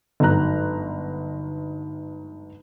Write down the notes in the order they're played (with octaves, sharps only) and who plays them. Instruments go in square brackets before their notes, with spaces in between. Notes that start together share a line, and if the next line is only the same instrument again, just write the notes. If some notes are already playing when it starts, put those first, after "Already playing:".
[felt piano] G1 G#2 F#3 A#5 F#6